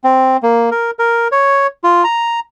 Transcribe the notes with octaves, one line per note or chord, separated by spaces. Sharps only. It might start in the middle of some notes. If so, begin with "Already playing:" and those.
C4
A#3
A#4
A#4
C#5
F4
A#5